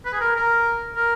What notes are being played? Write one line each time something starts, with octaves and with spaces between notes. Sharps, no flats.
B4
G#4
A#4
A#4
A#4